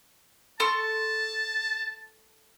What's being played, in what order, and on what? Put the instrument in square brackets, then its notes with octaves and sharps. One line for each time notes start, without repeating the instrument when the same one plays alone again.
[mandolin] A4 C6 C#6 [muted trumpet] A5